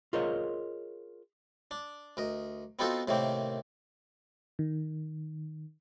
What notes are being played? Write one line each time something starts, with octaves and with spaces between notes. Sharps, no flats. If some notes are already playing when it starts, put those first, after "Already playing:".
F4 G#4 A#4 C5 C#5 D#5
D4
D2 A#4 D#5
B3 C4 D#4 F4 F#4 A4
A2 C3 D#3 A#3 C4
D#3